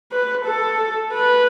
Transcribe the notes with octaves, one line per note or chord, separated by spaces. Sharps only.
B4
A4
B4